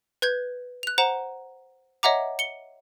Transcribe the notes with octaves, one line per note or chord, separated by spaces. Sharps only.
B4 G6 G#6
F#6 F7
C5 F#5 A#5 E7
C#5 D#5 E5 F#5 A#5 D6
C#7 G7